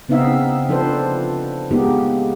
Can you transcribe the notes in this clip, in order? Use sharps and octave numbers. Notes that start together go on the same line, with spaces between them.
C#3 B3 C4 D#4 E5 F5
F3 D4 A4 B4 C5
G#3 A#3 B3 D#4 G4